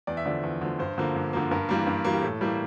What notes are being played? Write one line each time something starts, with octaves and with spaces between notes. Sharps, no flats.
E2 D5
E5
D3 F3 D5
E2
D3 F3
G2 C5
D3 F3 A#3
G2
D3 F3 A#3
G2 A#4
E3 G3 A#3
G2
E3 G3 A#3
G4
A2 A4
E3 G3 A#3